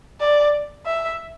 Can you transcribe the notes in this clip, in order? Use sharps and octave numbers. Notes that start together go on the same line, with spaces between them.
D5
E5